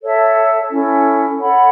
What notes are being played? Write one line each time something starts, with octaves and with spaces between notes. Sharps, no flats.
A4 C#5 E5 A5
C#4 E4 A4
A4 C#5 F#5 B5